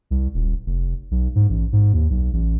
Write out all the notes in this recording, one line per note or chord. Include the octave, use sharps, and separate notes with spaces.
C2
D#1
F1
B1
G#2
A1
G#2
D#2
B1
A1